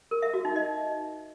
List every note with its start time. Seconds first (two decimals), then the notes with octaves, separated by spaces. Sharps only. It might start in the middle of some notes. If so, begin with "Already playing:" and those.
0.11 A#4
0.22 E5
0.34 F#4
0.45 D#4
0.56 D#5